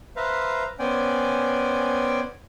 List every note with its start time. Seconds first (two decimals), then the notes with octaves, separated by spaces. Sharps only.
0.16 B4 C5 E5 F5 A#5
0.79 B3 C#4 C5 D5 G5 G#5